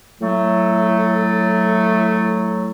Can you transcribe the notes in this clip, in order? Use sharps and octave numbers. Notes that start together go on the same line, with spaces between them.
A2 F#3 A3